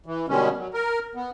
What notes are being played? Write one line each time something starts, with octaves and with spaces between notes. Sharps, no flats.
E3
B2 D3 D#3 G3 G#3 C#4
F#3
A#4
B3